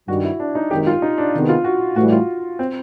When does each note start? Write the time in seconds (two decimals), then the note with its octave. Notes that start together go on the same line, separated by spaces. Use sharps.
0.08 G2 D#3 G3 F#4
0.24 E4
0.40 D4
0.55 D#4
0.71 G#1 F#2 D#3 G4
0.87 F4
1.02 D#4
1.18 D4
1.34 C3 D#3 G#3 B3
1.49 F4
1.64 F#4
1.96 A2 E3 G3 F#4
2.12 F4
2.59 C4